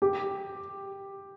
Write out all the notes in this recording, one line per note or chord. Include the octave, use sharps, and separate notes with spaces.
G4